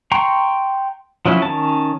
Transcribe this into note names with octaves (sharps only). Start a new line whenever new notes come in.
G5 A#5 C6 C#6
F3 F#3 C#4 E4
D#3 C#4 A5